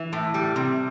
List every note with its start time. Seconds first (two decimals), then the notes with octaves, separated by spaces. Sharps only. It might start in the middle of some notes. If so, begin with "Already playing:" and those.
Already playing: E3
0.13 A2
0.34 G3
0.56 C3